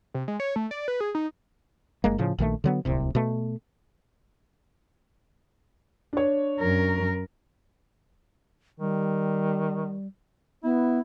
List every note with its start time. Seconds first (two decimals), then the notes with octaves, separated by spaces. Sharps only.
0.14 C3
0.28 G#3
0.40 C#5
0.56 A3
0.71 D5
0.88 B4
1.00 G#4
1.15 D#4
2.04 F#1 G#3 A#3
2.18 A2 C#3 F3
2.39 A#1 D#3 E3 A3
2.64 D3 F#3 B3
2.85 D1 C2 C3
3.15 B2 A3
6.13 D4 C#5
6.60 F#2 A#4
8.80 D#3 G3
10.64 B3 E4